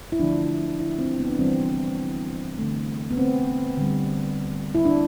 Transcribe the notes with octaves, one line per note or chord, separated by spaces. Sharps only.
E4
D3 F3 A3 D4
E4
C4
B3
D4
C3 E3 G3 C4
D3 A3
B3
C4
D3 G3
E4
D4